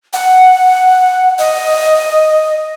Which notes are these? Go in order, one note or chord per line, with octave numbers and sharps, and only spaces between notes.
F#5
D#5